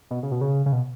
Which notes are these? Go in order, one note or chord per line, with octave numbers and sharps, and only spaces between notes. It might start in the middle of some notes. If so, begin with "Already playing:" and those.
B2
C#3
B2
C#3
C#3
B2